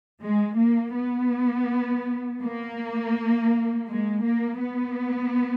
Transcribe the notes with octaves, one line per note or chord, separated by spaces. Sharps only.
G#3
A#3
B3
A#3
G#3
A#3
B3